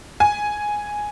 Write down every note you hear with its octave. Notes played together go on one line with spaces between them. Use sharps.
G#5